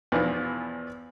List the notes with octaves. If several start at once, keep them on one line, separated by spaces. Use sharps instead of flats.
E2 B2 E3 F3